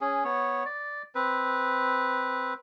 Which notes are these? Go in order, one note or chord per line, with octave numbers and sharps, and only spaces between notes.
C#4 G#4
B3 C#5
D5
C4 B4